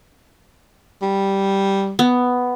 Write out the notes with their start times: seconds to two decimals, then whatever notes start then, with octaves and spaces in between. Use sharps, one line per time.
1.02 G3
1.99 B3